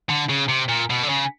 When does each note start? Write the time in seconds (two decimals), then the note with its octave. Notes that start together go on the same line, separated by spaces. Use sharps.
0.09 D3
0.29 C#3
0.49 C3
0.69 A#2
0.90 B2
1.03 D3
1.09 C#3